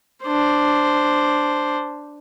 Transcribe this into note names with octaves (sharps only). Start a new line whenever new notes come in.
D4 C5